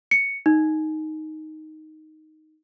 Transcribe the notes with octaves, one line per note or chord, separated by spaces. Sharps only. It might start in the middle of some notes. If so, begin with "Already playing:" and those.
C#7
D#4